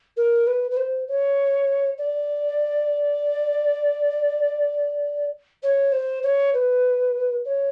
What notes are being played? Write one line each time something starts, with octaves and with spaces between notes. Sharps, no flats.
A#4
B4
B4
C5
C#5
D5
C#5
C5
C#5
B4
C#5